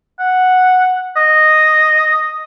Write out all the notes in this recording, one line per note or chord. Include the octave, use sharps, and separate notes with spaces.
F#5
D#5